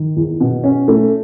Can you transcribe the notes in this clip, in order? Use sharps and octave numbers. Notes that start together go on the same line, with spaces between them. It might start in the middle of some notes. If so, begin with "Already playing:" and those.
Already playing: D#3
E2
B2
C#4
A3